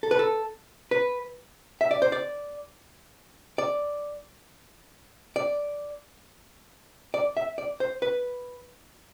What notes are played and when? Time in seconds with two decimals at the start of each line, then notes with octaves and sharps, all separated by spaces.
0.03 A4
0.11 B4
0.19 A4
0.91 B4
1.81 E5
1.91 D5
2.02 C5
2.12 D5
3.58 D5
5.36 D5
7.14 D5
7.37 E5
7.58 D5
7.80 C5
8.02 B4